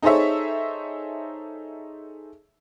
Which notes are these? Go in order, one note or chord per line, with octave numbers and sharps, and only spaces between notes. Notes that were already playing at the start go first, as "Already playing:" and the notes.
D#4 G#4 A4 C5 C#5 E5